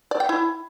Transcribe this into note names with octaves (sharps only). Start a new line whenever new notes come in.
D5
G5
E4